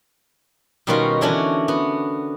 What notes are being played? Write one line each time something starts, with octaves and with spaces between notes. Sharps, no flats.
B2 D#3 G3 C#4 F4 F#4
D3 E3 C#4 D4 F#4
B3 F#4